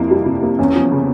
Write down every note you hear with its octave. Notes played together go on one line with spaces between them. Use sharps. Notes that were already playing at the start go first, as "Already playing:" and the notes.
Already playing: F2 C3 A#3 E4
G3
C3
A#3
E2 C#4
F3
C#3